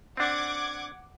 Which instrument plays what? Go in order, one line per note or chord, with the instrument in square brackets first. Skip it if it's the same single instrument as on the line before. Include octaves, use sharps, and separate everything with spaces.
[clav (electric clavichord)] C4 D4 [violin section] F#5 D6 G#6